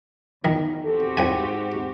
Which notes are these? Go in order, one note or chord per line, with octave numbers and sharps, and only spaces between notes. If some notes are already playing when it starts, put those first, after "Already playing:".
E2 D#3 D#4
C4 F#4 G4 A4
C2 G#2 G5 G#5